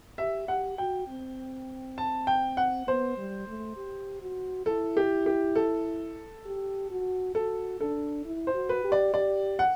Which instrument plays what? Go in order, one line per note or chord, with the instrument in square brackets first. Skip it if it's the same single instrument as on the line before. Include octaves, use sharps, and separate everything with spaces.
[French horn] G4 [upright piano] E5
[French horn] G4 [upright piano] F#5
[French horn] F#4 [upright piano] G5
[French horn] C4
[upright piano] A5
G5
F#5
[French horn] B3 [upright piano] C5
[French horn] G3
A3
G4
F#4
[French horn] E4 [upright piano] A4
[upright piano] G4
G4
A4
[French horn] G4
F#4
[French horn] F#4 [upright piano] A4
[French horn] D4 [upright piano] A4
[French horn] E4
[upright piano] C5
[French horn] F#4
[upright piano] B4
[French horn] G4
[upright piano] D5
[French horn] G4 [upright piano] D5
[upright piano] F#5